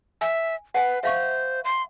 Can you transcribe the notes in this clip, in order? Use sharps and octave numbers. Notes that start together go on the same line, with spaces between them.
E5 G#5
B4 F#5 G#5
C5 E5 F5 C#6
C6